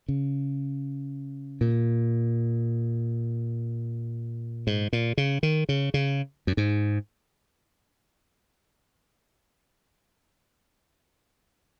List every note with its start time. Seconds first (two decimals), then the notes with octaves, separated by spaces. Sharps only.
0.08 C#3
1.61 A#2
4.67 G#2
4.93 A#2
5.17 C#3
5.43 D#3
5.69 C#3
5.94 C#3
6.47 F#2
6.57 G#2